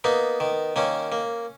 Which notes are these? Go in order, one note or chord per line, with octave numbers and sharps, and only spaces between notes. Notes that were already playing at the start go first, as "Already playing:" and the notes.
A#3 B3 D#4
D#3
D#3 A#3 C#4
A#3